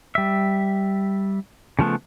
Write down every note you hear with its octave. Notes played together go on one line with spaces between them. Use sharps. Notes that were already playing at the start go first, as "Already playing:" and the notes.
G3 E5
C#3 F3 A3 B3